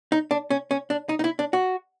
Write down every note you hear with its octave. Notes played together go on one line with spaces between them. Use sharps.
D#4
D4
C#4
C#4
D4
D#4
D#4
E4
D4
F#4